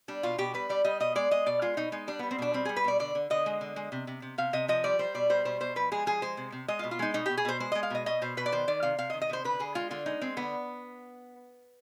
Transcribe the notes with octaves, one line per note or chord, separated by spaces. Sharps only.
G3 D4
B2 F4
B2 G4
G3 B4
G3 D5
G3 D#5
B2 D#5
G#3 D5
G#3 D#5
B2 D5
G#3 F4
B2 D#4
G#3 D#4
G3 D4
G3 B3
C4
B2 D4
G3 C4
G3 G#4
B4
B2 D5
D3 D5
D3
D3 D#5
G#3
D3
G#3
C3
C3
C3
C3 F5
C3 D#5
F3 D#5
G3 D5
G3 C5
B2 D5
G3 C5
B2 C5
B2 C5
F3 B4
G#3 G#4
F3 G#4
G#3 C5
C3
C3
G#3 D#5
F4
B2
F4
G#3 D#4
B2 D#4
B2 G4
G#4
B2 C5
G#3 C5
G#3 D#5
F5
B2 D#5
B2 D#5
B2 C5
B2 B4
D5
D#3 C5
D#3 D5
C3 F5
C3 F5
D#5
D#3
D#5
C3 C5
D3 B4
D3 G#4
G#3 F4
D3 F4
G#3 D#4
G#3 C4
D3 B3